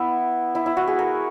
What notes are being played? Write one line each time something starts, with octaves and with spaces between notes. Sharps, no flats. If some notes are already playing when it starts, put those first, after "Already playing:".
Already playing: B3 E4
E4
E4
F#4
G#4
A#4